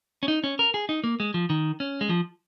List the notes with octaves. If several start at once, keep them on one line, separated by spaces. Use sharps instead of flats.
C#4
D#4
C#4
A#4
G#4
D#4
A#3
G#3
F3
D#3
C#4
G#3
F3